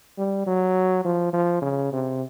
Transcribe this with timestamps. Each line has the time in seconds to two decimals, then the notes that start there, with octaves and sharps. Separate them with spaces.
0.18 G3
0.47 F#3
1.05 F3
1.33 F3
1.62 C#3
1.92 C3